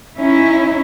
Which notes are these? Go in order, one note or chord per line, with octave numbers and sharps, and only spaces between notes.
C#4 D#4 E4